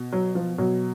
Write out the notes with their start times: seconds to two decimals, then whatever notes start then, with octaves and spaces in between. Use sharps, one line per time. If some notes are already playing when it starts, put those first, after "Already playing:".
Already playing: B2
0.12 F#3
0.35 F3
0.58 B2 F#3